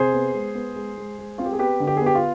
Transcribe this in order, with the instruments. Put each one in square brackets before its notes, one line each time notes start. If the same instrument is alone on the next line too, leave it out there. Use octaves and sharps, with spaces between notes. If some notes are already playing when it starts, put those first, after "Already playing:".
Already playing: [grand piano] C3 G#4 C5
B3
G#3
B3
G#3
G#3
G#3
C4 F4
G4
G#4
B3 G4 B4
D3
G4
G#4
B3
G4
F4